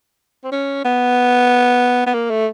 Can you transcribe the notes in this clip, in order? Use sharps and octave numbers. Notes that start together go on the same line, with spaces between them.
C4
C#4
B3
B3
A#3
A3